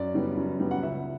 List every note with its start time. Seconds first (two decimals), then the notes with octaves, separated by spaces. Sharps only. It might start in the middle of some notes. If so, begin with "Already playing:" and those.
Already playing: F#2 D5
0.14 C#3 G3 B3
0.37 F#2
0.60 C#3 G3 B3
0.71 F#5
0.83 C#2 E5